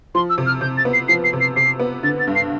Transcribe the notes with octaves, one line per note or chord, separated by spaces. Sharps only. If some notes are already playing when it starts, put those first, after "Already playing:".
F3 C6
E6
C3
F6
C3 G6
A6
B3
C7
F3 C7
C7
C3
C7
C3 C7
B3
D3 A6
A6
G2
C7